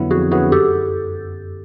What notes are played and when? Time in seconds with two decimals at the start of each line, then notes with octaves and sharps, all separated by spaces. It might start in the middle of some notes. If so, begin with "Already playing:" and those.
Already playing: F2 D3 F#3 B3 E4
0.11 F2 F#4 G#4
0.31 D3 F#3 B3 E4 F#4 G#4
0.52 F#2 G4 A4